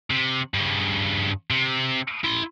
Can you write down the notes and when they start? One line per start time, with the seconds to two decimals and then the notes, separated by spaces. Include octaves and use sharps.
0.11 C3
0.54 G2 C#3
1.50 C3
2.24 E4 C6